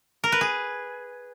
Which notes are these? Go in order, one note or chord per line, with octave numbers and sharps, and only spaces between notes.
A#4
B4
G#4